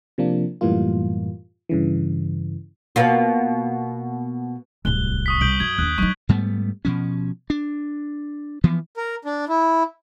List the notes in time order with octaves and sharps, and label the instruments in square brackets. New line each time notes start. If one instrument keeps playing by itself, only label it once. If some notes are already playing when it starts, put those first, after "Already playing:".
[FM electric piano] C3 F3 A#3 D4
F#2 A2 E3 G3 A#3 F4
G2 C#3 E3
[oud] B2 A#3 F4
[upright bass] D1 C2 [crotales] F#6 G7
[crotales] C#6 D#6 B6
[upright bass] C2 C3 [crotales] G6 D7 F#7
[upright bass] F#2 [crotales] G#6
[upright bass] D#2 D4 [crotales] F#6
[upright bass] F#3 D#4 [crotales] C#6
[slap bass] G#2 G3 A3 B3
B2 F3 C#4
D4
E3 F3 B3
[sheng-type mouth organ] A#4
D4
E4